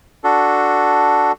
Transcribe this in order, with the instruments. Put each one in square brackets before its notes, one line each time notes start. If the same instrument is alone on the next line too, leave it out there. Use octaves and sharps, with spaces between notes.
[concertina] D4 F#4 A4